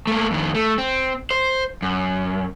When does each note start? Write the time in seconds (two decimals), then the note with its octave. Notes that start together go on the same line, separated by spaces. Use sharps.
0.07 A3 A#3
0.31 F2 D#3
0.55 A3
0.78 C4
1.31 C5
1.82 F#2